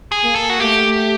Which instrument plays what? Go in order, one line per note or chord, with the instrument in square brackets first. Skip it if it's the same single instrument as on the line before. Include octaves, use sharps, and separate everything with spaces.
[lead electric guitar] G#4
[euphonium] A#3
[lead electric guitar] A4
F#4
[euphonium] A3 [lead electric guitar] G4